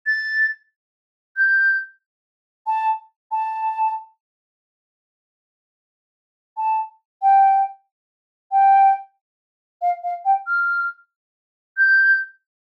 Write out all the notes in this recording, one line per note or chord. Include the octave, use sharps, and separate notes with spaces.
A6
G6
A5
A5
A5
G5
G5
F5
F5
G5
F6
G6